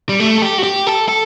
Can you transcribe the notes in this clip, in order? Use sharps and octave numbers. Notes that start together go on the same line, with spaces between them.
G3
A3
A4
G4
F#4
G4
A4
A4